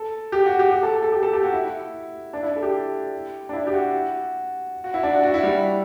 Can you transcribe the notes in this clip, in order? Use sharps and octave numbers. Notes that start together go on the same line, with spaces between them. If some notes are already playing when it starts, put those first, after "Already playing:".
Already playing: A4
G4
F#4
G4
G4
A4
A4
G4
A4
G4
F#4
E4
D4
E4
A4
G4
D4
E4
G4
F#4
F#4
E4
D4
F#4
F#4
E4
G3